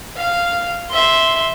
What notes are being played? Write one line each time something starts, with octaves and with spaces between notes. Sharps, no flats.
F5
E5 C6